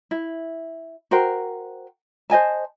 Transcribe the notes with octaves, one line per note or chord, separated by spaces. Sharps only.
E4
F#4 A#4 C5 G5
C5 D#5 G#5 A5